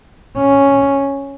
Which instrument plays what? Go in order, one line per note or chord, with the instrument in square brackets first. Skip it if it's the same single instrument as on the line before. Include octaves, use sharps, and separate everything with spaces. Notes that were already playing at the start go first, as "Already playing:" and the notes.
[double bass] C#4